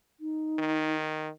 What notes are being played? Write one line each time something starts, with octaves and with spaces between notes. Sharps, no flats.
D#4
D#3